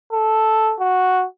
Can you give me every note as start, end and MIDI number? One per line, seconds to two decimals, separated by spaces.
0.13 0.74 69
0.80 1.24 66